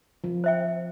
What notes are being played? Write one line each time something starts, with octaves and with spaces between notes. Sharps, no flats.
F3
C5 E5 G5